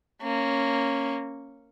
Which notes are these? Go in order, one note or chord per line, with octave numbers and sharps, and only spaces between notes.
A#3 C#4